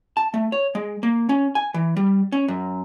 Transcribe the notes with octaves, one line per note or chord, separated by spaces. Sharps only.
A5
A3
C#5
G#3
A#3
C#4
G#5
E3
G3
C#4
F#2